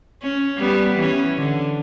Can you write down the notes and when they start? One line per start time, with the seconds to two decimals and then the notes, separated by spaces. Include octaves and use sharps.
0.23 C#4
0.58 G3 B3
0.99 E3 C#4
1.37 D3